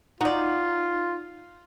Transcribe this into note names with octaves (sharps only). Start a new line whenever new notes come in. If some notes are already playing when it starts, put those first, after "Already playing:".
D#4 F4 F#4 D5